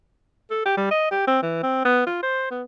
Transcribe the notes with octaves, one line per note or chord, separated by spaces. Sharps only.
A4
G4
G3
D#5
G4
C4
E3
C4
B3
F4
C5
B3